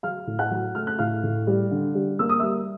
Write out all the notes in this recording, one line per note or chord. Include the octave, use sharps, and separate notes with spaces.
F#3 F5 F6
A2
F#5 F#6
F#3
A3 F6
F#6
A2 F5 F6
A2
G3
D3
G3
A#3 E6
D#6
G3 E5 E6